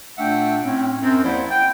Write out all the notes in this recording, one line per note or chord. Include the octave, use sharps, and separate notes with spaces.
A#2 A3 D4 E5 F#5 G5
A2 C4 C#4
F#2 C4
D#2 F3 E4 C5 D5 F#5
G5